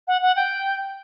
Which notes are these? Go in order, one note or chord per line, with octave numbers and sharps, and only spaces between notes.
F#5
F#5
G5